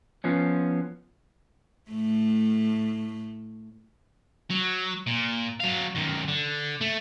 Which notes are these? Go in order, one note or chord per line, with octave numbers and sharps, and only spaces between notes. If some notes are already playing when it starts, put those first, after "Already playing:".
F3 B3 C#4
A2 A3
F#3
A#2
F#3 F5
F#2 D#3
D3
A3